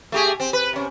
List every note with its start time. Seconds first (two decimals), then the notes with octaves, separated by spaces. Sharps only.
0.12 A3 G4 G#4
0.40 C4
0.53 B4
0.73 C3 C#4